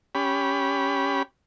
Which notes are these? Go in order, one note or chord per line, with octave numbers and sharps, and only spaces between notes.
C#4 G4 B5